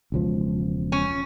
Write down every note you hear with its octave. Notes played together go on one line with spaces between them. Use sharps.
E1 C#2 F3
C#4